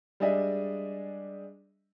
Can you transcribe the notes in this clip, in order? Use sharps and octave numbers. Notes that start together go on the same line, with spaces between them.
G3 G#3 D4 G#4 D#5 E5